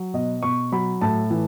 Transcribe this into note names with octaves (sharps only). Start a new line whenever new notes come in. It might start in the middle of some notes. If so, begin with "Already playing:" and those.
Already playing: F#3
B2 D#5
B2 C#6
F#3 B5
A2 A5
E3